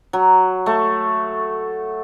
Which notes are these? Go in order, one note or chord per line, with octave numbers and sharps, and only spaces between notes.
F#3
A3